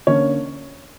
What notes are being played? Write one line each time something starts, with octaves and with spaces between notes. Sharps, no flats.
D3 A#3 C#4 C#5